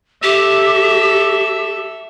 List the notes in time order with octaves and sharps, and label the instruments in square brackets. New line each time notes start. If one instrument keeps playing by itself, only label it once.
[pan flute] G4 [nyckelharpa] A4 E5